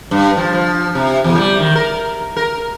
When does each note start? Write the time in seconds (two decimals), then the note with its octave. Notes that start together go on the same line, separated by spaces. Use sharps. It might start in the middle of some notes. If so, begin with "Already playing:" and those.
0.11 G2
0.37 F3
0.53 F3
0.95 C3
1.24 E2
1.38 G3
1.60 D#3
1.76 A#4
2.37 A#4